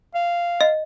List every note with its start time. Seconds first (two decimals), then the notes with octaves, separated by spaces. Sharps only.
0.15 F5
0.61 D#5